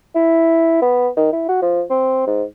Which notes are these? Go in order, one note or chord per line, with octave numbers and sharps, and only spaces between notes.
E4
B3
D#3
E4
F#4
F3
C4
G#2